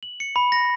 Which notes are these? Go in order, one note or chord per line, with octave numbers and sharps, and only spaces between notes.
F#7
C#7
B5
A#6